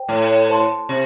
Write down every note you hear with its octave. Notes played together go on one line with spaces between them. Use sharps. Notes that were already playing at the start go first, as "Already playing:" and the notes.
Already playing: C5 G5
A2
C5 A5 C6
C3